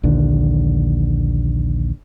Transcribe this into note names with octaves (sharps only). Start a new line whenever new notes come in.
A#1 D#2 D3